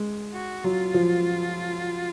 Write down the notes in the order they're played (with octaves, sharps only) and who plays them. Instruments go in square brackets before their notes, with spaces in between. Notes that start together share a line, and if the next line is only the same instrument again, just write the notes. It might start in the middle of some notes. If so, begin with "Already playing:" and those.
Already playing: [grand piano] G#3
[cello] F#4
[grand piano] F#3 [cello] F4
[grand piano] F3